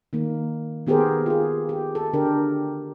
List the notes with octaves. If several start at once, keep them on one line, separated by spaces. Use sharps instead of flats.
D#3 A#3
D#3 B3 G4 G#4 A#4 C5
F4 G#4
G4
A4
D3 D4 G4 A#4